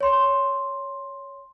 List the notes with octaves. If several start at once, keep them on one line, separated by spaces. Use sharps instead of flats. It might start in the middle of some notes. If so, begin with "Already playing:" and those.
C#5 C6